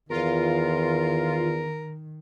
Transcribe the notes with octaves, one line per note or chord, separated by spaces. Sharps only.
E2 D#3 F4 A#4